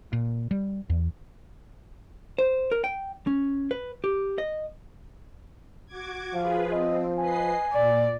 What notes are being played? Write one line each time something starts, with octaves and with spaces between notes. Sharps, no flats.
A#2
G3
E2
C5
A#4
G5
C#4
B4
G4
D#5
F#4 D6 G#6
F3 F4 G#4 B4 F5
C4 D#5
B4 D#5 G#5 C7
A#2 D5